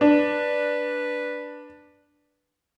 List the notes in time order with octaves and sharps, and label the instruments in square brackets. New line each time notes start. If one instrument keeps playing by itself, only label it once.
[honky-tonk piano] D4 [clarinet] B4